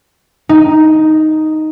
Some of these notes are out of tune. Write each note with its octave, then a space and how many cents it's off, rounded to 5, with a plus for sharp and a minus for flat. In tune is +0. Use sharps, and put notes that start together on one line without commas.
D#4 +0